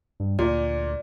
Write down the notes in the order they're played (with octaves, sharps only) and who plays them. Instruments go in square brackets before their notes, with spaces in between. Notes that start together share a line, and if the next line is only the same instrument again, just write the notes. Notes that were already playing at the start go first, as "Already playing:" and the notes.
[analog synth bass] G2
[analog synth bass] D2 [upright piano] A#2 [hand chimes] D5